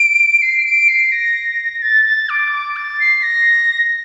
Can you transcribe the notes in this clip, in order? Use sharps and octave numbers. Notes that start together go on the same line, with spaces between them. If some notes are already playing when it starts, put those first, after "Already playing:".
Already playing: D7
C7
D7
C7
A#6
A6
A6
D6
D6
A6
C7
A#6